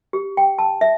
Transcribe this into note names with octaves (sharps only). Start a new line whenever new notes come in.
G4
G5
A5
E5